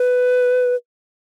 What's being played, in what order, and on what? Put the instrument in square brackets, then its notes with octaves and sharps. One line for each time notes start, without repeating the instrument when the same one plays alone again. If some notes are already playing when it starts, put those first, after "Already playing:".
Already playing: [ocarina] B4